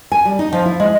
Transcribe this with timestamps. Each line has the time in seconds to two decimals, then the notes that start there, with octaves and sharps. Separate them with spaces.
0.12 G#5
0.25 G3
0.39 D#4
0.53 F3
0.65 E4
0.80 G#3